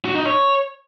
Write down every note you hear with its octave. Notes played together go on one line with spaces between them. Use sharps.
F#4
D#4
C#5